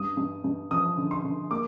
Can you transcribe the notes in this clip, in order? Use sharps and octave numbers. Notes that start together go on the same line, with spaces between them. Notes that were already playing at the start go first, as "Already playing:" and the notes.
Already playing: G2 D#6
G2
G2
F3 D#6
D3
C6
D3
A#3 D6